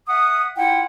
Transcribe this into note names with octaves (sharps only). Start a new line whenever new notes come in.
E5 F#5 D#6
E4 F4 F#5 G5